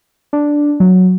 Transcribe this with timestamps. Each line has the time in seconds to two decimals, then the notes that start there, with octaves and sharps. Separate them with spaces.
0.33 D4
0.80 F#3